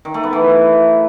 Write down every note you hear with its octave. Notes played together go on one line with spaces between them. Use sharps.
D#3
A3
B3
E3